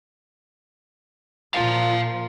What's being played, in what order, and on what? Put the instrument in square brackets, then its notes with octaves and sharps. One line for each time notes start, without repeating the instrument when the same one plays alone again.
[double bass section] A#2 F3 [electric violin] F4 A#4 [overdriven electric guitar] F5 A5